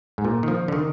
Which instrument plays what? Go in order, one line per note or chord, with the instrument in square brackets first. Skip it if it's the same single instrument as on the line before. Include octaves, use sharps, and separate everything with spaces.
[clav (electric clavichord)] G#2
A#2
D#3
F3
D3
D#3